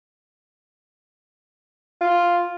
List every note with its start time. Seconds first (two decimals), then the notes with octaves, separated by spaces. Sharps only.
2.01 F4